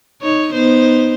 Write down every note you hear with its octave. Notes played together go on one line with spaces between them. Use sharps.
D#4 C#5
B3 D#4 C5